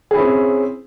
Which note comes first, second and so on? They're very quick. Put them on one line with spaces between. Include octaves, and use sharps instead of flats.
G#4 E4 C#4 C4